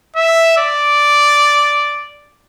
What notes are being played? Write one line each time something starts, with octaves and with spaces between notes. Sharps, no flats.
E5
D5